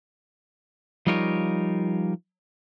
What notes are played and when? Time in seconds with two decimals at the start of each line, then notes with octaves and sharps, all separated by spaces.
1.07 F3 G3 D#4 F4 A#4 C#5